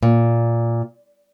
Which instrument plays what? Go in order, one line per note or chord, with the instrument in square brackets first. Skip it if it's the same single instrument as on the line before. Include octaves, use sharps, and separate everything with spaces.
[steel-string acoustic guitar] A#2